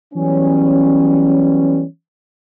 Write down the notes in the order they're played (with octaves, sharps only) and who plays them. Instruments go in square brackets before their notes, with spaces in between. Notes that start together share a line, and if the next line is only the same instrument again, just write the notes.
[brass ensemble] E3 F#3 G3 B3 C#4